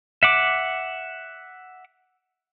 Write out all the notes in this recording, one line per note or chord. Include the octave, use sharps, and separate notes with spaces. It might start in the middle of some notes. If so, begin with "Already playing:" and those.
E5 F#5 D6